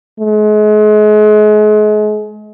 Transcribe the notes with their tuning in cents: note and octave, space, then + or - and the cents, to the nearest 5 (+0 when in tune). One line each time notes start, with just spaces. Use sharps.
G#3 +35